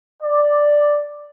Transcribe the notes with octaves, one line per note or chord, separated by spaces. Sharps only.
D5